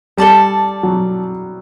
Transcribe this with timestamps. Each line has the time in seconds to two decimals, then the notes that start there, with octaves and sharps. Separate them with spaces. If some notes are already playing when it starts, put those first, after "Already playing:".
0.17 G3 A4 D5 A5
0.83 F#3